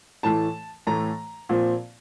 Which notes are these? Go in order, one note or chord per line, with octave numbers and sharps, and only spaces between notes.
A2 E3 A3 A5
A2 E3 A3 A#5
A#2 F3 C4